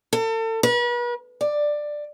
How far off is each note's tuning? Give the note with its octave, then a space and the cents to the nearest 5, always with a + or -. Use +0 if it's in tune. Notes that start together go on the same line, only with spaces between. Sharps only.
A4 +35
B4 -40
D5 +10